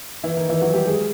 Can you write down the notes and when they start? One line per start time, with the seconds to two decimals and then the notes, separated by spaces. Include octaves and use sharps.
0.24 E3 E4
0.37 D#3 D#4
0.49 E3 E4
0.61 F#3 F#4
0.74 G3 G4
0.87 G#3 G#4